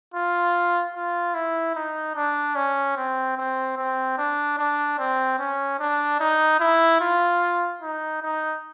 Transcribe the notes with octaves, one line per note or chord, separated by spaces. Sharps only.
F4
F4
E4
D#4
D4
C#4
C4
C4
C4
D4
D4
C4
C#4
D4
D#4
E4
F4
D#4
D#4